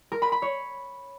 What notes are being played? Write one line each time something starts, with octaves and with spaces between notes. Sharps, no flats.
A#4
B5
B5
C#5